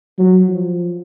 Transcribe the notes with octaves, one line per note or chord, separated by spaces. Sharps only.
F#3
F3